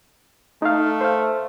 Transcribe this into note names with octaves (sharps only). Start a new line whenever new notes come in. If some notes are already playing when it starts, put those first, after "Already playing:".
A3 D#4 F5
C5 F5